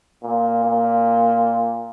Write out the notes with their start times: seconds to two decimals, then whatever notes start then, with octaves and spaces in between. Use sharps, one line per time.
0.23 A#2
0.64 A#2